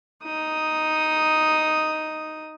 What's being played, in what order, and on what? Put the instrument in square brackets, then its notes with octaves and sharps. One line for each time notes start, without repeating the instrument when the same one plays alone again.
[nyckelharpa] D#4 D#6